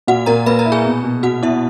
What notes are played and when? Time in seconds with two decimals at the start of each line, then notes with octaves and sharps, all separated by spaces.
0.07 A#2 F#4 F#5
0.26 A#2 A#4 A#5
0.46 A#3 B4 B5
0.59 A#4 A#5
0.65 E4
0.72 G#4 G#5
0.85 B2
1.04 B2
1.23 B2 F#4 F#5
1.42 B2 E4 E5